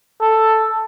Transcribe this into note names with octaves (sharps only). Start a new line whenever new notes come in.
A4